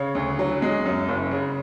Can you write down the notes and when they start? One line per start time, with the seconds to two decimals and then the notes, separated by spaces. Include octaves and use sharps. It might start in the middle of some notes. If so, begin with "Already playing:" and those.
Already playing: C#3 C#5
0.15 D2
0.39 F#3
0.62 G#3
0.85 F#2
1.09 F#1
1.31 C#3